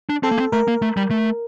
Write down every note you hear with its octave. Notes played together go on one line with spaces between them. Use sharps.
D4
C4 A4
A#3
C4
A3 A#4
A#3
A3
G3
A3